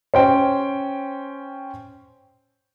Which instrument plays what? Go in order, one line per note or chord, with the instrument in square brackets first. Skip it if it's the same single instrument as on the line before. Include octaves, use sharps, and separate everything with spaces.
[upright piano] C#4 C5 G5